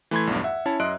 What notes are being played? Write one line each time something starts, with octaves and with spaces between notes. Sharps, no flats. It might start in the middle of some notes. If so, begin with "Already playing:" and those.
E3 A3 B5 C6 G#6
B1 E2 G2
E5 F#5
C#4 E4 C#5 A5
F#2 D#5 E5 C6 F#6 D7